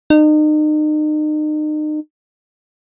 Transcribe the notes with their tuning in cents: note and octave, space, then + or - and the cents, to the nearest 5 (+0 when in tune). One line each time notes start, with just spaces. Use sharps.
D#4 -35